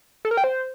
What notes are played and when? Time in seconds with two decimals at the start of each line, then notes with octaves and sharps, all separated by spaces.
0.25 A4
0.31 A#4
0.37 G5
0.44 C5